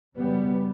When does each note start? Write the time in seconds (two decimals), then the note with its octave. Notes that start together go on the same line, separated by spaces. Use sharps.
0.16 F#1 F#2 C#3 G3 B3